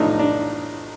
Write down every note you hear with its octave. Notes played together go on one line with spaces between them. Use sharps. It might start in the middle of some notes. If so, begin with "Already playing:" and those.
Already playing: B1 A2 F3 A3 D4 D#4
D4